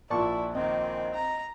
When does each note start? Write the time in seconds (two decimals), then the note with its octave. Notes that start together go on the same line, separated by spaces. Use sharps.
0.10 A#1 A#2 E4 D5 A5 C#6
0.55 D#3 C4 D#5
1.14 A#5